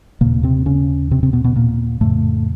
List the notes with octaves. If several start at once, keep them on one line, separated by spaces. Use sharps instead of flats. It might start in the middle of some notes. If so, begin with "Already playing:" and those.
D#2 A#2 C#3 A#3
C3 C4
C#3 C#4
C3 C4
C3 C4
B2 B3
B2 B3
A#2 A#3
F2 A2 C#3 A3